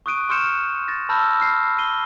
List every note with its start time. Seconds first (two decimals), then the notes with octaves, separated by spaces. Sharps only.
0.06 C#6 D#6 F#6 D7 D#7
0.29 C6 C#6 F6 G6 C#7 E7
0.88 A6 A#6
1.09 A5 B5 E6 F6 G6 A#6
1.40 F6 C7
1.78 C7 D#7 G7